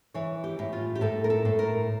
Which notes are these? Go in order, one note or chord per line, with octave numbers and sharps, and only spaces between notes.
E3 C#5
G4
A2
F4
G4
A2 A4
A#4
A4
A2
A#4